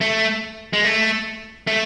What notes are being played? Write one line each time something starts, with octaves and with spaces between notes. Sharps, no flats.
A3
G#3
A3
A3